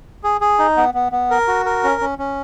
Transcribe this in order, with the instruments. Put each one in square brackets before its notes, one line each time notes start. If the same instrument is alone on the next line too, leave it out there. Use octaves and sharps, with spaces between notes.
[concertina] G#4
G#4
D#4
B3
B3
B3
A#4
F#4
A#4
C#4
C#4
C#4